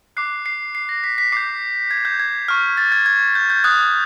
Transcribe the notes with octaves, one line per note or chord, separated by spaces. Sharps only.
D6 F#6 C7
C7
C7
A#6
B6
B6
D6 G6 C7
G#6
G6
G#6
C#6 F6
A6
G#6
G#6
G6
G6
D#6 F#6 G#6